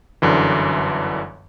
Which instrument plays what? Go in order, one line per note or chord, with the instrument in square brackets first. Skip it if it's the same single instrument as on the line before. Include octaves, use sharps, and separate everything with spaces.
[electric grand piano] G1 F#2 D3 E3